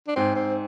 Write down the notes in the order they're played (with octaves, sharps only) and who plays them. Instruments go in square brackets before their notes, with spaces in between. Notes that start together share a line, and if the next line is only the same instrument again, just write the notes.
[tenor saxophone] D4
[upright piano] G#2 [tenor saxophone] C4
[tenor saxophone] C4